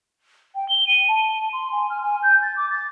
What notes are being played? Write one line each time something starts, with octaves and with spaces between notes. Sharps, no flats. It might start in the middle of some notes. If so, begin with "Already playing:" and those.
G5
G7
D#7
A5
C6
G#5
F6
G#5
G6
A6
D6
A6